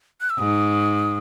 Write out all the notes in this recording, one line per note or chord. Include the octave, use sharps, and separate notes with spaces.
F#6
E6
G#2 D#6